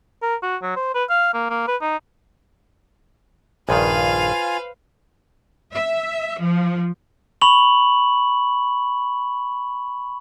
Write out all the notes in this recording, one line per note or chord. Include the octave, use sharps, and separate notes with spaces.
A#4
F#4
F#3
C5
B4
F5
A#3
A#3
B4
D#4
A#1 G2 D#3 F4 B4 C5 F5 G#5
E5
F3
B5 C#6 F#7